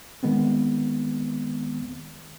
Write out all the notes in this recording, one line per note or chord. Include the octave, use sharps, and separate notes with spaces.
D#3 G#3 B3 C4